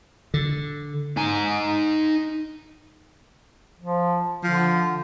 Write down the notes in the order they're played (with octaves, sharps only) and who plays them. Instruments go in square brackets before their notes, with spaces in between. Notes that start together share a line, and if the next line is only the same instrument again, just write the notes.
[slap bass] D3
[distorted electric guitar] D#4 G#5
[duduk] F3
[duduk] D3 [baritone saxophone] F3